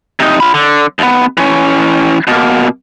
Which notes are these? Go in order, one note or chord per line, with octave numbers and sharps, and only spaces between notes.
C3 D#4
F4 B5
D3
D#2 B3
E3 C#4
B2 A#3